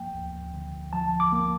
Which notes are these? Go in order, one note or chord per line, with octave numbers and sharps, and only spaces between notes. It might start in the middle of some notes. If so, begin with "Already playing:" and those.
Already playing: F3 A#3 G5
D2
D3
F3 A5
D6
A#3